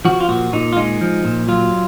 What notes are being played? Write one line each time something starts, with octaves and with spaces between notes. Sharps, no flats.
F3 F#4
F4
A#2 F#4
A#2 D#4
F4
G#3 D#4
F3
A#2
F#3 F4